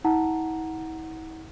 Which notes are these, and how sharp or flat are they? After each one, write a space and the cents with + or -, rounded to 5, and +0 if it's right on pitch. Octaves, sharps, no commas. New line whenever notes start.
E4 -45 F#5 +0 A#5 +0